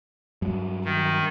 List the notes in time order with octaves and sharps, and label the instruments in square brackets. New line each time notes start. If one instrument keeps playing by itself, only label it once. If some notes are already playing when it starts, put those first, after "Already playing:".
[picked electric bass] G2 F#3
[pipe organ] D#3